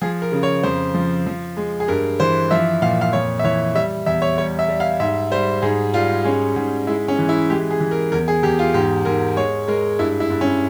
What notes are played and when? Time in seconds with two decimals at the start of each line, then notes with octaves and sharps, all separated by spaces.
0.01 F3 G#4
0.22 A#4
0.32 C#3
0.43 C#5
0.63 F2 C5
0.94 F3
1.26 F3
1.57 G#3
1.80 G#4
1.88 G2 A#4
2.20 E3 C5
2.51 F3 E5
2.82 A#2 F5
3.01 F5
3.13 F2 C#5
3.39 E5
3.44 E3 C#5
3.75 G3 E5
4.06 E2 E5
4.22 C#5
4.38 G3 C#5
4.59 E5
4.69 G3
4.80 F5
5.00 G#2 E5
5.32 G3 C5
5.62 G#2 G#4
5.94 G3 F4
6.24 G#3 C#4
6.56 G#2
6.87 G#3 E4
7.08 C#4
7.19 E3
7.29 E4
7.50 G#3 G4
7.71 G#4
7.80 E3
7.91 A#4
8.12 E2 A#4
8.28 G#4
8.43 E2 G4
8.59 F4
8.74 G#2 G4
9.05 G#2 A#4
9.36 G#3 C#5
9.68 G#3 A#4
9.99 G2 E4
10.20 E4
10.30 G2
10.41 C#4